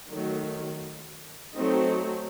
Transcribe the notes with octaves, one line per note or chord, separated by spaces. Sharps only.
D#3 F#3 A3
F#3 A3 C4 D#4